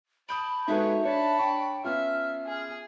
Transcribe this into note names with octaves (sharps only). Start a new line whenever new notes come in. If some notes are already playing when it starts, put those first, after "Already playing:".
A5 B5 D#6 G6 D7
G#3 D#4 F#4 G#4 A4 B4 C#5 E5
D4 C#5 A5 B5
D4 G5 C#6
B3 C#4 F4 E5 F6
G#4